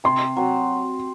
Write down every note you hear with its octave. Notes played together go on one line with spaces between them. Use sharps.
C3 C6
F#3 C4